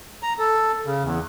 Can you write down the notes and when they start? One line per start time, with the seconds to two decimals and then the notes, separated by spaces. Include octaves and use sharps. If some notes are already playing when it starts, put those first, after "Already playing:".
0.23 A#5
0.39 A4
0.86 C#3
1.03 E2